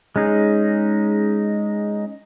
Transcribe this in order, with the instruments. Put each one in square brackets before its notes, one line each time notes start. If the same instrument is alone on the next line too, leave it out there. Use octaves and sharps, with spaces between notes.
[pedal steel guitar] G#3 C#4 D#4 G#4